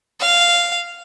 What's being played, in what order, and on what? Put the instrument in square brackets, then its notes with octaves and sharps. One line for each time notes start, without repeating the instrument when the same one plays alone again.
[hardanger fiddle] F5